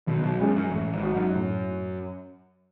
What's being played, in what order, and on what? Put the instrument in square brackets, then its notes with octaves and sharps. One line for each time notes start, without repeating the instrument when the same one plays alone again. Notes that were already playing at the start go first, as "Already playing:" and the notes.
[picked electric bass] B1 B2 [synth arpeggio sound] D#3
[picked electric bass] B1 B2
[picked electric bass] F#2 [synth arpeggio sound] G#3 C#4 G#4
[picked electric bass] F#2
[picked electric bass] A1 A2 [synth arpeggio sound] A3
[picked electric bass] G#1 G#2
[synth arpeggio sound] D#4 F#4
[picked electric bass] F#2
[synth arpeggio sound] A2